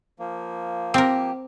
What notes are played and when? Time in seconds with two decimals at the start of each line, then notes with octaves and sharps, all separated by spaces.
0.19 F3 A#3
0.94 C4 G4 A#4